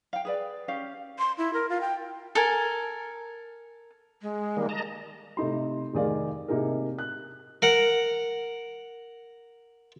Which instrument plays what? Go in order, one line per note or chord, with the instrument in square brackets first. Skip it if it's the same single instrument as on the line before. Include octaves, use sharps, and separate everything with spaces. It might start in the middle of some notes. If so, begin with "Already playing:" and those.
[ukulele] F5 G5
G#4 B4 D5
C#4 G4 F5
[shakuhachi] C6
E4
A#4
F4
G5
[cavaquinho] A4 A#4 G#5
[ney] G#3
[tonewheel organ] D#3 G3 A#3
D#5 A5 A#5
[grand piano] C3 A3 D#4 C6
F1 D#3 G#4 D5 F5
C3 A#3 D#4 G#4 A#4
F#6
[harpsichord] A#4 F#5